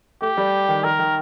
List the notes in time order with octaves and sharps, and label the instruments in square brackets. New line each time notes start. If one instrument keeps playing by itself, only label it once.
[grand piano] A3 [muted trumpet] G4
[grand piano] G3
D#3
[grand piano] D#3 [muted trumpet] A#4
[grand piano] D#3